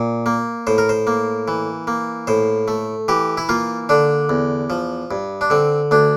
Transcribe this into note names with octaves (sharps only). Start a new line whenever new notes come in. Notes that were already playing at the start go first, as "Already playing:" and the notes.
Already playing: A#2
A#3
A2 C5
A#4
C5
A#3
E3
A#3
A2 C5
A3
E3 G4
E4
A#3 F4
D3 D4
E2
F3
G2
D4
D3 C4
D2 D4